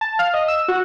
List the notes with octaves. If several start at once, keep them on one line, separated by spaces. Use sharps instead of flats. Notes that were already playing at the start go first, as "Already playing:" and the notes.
A5
F5
D#5
E6
F#4